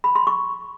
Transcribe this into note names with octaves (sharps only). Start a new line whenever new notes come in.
B5
C6
C#6